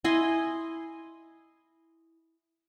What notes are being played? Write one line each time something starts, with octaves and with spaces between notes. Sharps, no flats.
E4 D#5 G#5 C6